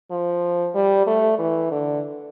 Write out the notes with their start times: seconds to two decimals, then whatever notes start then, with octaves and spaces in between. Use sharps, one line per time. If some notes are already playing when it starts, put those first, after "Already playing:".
0.11 F3
0.75 G3
1.07 A3
1.39 E3
1.71 D3